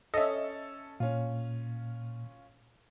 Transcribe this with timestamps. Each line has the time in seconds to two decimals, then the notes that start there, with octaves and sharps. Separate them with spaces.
0.14 C#4 A4 D#5 E5
1.00 A#2 C#4 F4